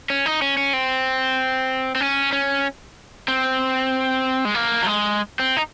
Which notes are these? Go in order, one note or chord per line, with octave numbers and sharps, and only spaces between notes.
C#4
D#4
C#4
C#4
C4
C4
C#4
C#4
C4
G#3
A#3
F#3
G#3
C4
D#4